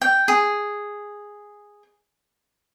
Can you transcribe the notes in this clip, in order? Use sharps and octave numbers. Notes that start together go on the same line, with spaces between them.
G5
G#4